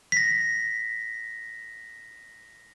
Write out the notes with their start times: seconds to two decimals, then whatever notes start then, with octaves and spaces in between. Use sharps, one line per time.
0.12 A#6 B6